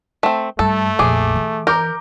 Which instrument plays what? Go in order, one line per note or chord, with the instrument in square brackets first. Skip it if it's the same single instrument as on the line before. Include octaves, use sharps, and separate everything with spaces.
[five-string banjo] A3 C4
[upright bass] G2 [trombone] A3 [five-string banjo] A4
[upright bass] A#1 F2 [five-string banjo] G#4 [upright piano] D6
[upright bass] E3
[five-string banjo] A#4 [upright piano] A#5 D6 G6